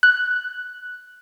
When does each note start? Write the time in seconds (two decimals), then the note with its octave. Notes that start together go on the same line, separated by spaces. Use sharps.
0.03 F#6